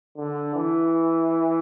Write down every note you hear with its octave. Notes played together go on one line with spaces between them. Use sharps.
D3
E3